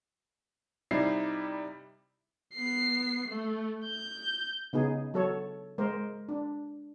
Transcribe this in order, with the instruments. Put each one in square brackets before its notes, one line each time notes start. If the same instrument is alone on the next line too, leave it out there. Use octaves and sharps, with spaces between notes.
[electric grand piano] C3 G3 D#4 E4 C7
[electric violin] B3 C7
A3
G6
[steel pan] C#3 B3 D#4 G#4
F#3 A4 C#5
G#3 A#4 C5
D4